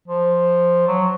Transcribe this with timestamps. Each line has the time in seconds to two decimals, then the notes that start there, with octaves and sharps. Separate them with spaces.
0.08 F3
0.87 F#3